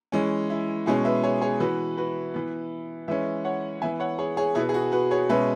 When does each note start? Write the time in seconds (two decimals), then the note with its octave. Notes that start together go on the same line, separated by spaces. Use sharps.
0.12 E3 G#3 C#4
0.50 E4
0.86 B2 G#3 C#4 E4 G#4
1.05 B4 E5
1.23 G#4 C#5
1.41 G#4 C#5
1.60 E3 B3 F#4 B4
1.97 F#4 B4
2.34 E3 B3
3.08 E3 G#3 C#4 B4 E5
3.45 C#5 F#5
3.82 E3 B3 E5 G#5
4.00 C#5 F#5
4.19 G#4 C#5
4.37 G#4 C#5
4.55 B2 B3 E4 G#4
4.69 G#4
4.74 F#4
4.92 F#4 B4
5.11 G#4 C#5
5.29 B2 G#3 C#4 B4 E5